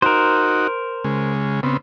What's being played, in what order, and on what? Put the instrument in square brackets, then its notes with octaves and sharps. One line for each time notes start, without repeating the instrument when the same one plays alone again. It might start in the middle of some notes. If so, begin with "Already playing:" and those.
[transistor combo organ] D#4 F#4 [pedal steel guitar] A#4 C5
[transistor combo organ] C#3 G#3
C#3 B3 C4